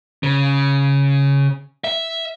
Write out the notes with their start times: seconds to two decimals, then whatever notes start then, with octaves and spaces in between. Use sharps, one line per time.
0.23 C#3
1.84 E5